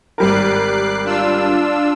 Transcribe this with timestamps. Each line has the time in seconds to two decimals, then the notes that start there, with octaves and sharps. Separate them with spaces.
0.18 G#1 G3 A#4 D6 F#6 C7
1.04 D4 F4 E6